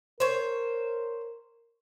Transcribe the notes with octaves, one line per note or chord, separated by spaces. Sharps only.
A#4 C5 C#5